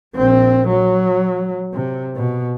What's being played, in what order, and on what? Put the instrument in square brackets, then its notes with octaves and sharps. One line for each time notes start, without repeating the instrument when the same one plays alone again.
[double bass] A#1 C4
F#3
C3
B2